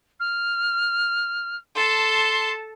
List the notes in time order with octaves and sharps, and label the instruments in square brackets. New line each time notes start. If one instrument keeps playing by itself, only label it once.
[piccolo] F6
[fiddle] A4 A5 [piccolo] C6